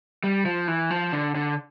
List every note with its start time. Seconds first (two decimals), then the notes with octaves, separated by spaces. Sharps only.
0.24 G3
0.45 F3
0.68 E3
0.91 F3
1.13 D3
1.35 D3